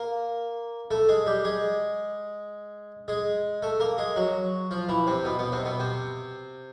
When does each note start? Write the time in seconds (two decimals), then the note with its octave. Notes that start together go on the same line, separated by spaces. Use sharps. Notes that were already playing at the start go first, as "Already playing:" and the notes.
Already playing: A#3 A#4
0.91 A3 A4
1.08 G#3 G#4
1.26 G3 G4
1.44 G#3 G#4
3.08 G#3 G#4
3.62 A3 A4
3.80 A#3 A#4
3.98 G#3 G#4
4.16 F#3 F#4
4.71 F3 F4
4.89 E3 E4
5.07 C3 C4
5.25 B2 B3
5.39 B2 B3
5.52 C3 C4
5.65 B2 B3
5.80 C3 C4